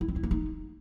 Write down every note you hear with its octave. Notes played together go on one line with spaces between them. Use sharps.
E4
C4
E4
A#3
D#4